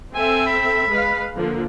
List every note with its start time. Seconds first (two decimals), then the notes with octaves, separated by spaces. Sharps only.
0.14 C4 A4 E5 G#5
0.46 B5
0.89 G#3 B4 F5
1.34 D3 F3 A#3